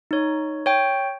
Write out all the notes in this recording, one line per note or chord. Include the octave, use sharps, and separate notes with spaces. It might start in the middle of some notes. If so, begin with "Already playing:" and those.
D#4 C#5
C#5 G5